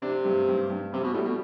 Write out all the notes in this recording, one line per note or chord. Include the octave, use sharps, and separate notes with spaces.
C3 D4
G2
G2
G2
C3 G3
B2
A2 G3
B2